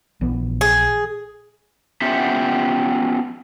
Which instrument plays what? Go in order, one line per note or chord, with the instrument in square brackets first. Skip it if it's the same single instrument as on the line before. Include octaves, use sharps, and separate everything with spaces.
[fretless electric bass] A#1 E3 B3
[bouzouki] G#4
[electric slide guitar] B3 C#4 F4 G4 E5 F#5